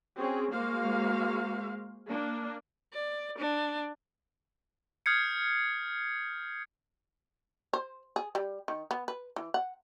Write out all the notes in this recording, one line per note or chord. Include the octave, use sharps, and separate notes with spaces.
C4 C#4 F#4 G#4
G#3 A#3 F#4 C5 F5
A#3 D4
D5
D4
D#6 F6 G6 G#6 C7 C#7
C5
G#4
G3
D#3
B3
B4
E3
F#5